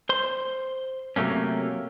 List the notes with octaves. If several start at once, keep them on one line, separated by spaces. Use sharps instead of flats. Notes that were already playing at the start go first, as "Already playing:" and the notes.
C5 C6
C3 F#3 A3 A#3 C#4